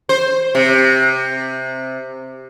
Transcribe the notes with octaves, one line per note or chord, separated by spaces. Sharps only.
C5
C3